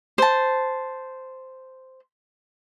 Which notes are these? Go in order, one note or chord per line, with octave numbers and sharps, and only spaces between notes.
C5 A5